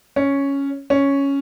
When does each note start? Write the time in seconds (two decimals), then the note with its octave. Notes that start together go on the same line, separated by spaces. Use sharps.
0.16 C#4
0.90 C#4